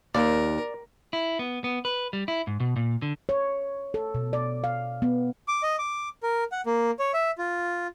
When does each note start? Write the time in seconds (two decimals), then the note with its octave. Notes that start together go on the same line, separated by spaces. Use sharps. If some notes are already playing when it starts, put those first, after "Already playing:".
0.15 D#2 A#4 D5
1.13 E4
1.39 B3
1.64 B3
1.85 B4
2.13 G3
2.28 E4
2.47 G#2
2.60 B2
2.76 A#2
3.02 D3
3.29 C#5
3.94 A4
4.15 B2
4.33 D5
4.64 F5
5.02 B3
5.48 D6
5.63 D#5
5.79 D6
6.23 A#4
6.52 F#5
6.66 A#3
6.99 C#5
7.14 E5
7.38 F4